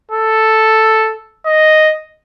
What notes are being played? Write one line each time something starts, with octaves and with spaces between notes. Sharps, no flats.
A4
D#5